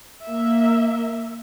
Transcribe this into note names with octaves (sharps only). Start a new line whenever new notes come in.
A#3 E5